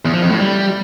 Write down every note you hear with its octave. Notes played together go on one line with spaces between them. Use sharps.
E2
F3
F2
A2
G3